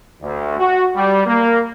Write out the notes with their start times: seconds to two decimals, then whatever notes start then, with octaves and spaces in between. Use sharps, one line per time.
0.22 D2
0.59 F#4
0.96 G3
1.26 A#3